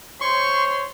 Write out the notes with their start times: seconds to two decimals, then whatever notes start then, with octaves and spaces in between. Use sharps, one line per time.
0.21 C5 C#5 C6 C#6